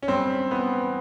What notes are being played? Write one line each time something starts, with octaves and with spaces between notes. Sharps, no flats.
C#4
G2 C4
E3 B3